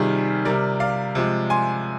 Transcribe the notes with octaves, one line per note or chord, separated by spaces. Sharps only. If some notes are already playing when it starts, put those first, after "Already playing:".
Already playing: C3 D#3 G3 F4 G#4
C3 G3 A#4 D5
D5 F5
C3 F3 G#3
G#5 C6